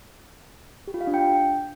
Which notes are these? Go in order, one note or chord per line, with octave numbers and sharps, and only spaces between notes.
G4
F4
F5
D4
G5